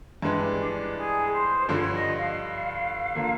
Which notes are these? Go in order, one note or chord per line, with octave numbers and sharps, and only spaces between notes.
G2 E3 G#3 D4
G#4
C5
G2 D3 F3 C#5
D#5
F5
D3 F3 A#3